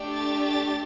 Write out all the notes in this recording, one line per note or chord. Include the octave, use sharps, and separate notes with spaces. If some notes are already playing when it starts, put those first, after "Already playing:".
Already playing: A3 D4 G4
A6
A6